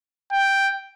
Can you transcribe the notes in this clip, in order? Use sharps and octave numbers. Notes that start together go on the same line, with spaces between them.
G5